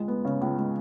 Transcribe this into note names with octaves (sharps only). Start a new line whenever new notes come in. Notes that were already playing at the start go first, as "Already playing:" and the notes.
Already playing: C#2 G#3
B3
C#3
C#2
G#3